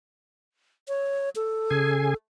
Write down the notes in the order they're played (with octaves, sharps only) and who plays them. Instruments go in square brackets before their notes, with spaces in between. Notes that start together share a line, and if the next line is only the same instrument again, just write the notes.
[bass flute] C#5
A4
[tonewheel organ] C#3 G#4 G#5